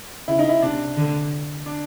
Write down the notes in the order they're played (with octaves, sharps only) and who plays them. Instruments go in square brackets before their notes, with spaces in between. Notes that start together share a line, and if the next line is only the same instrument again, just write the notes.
[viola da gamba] C#3 [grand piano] E4
[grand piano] D#4
E4
[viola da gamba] C3 [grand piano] D4
[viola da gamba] D3
[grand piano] D4